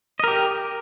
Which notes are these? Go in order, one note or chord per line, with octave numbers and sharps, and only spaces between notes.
G4 A#4 D#5